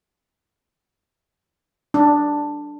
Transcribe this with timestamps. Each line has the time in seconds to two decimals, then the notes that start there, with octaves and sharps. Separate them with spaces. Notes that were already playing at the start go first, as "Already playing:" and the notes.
1.94 D4